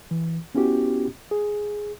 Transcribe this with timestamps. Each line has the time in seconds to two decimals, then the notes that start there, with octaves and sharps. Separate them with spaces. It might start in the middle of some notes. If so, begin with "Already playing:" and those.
0.11 E3
0.55 B3 C#4 E4 F#4 G4
1.31 G#4